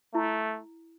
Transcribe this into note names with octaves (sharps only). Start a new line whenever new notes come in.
A3 E4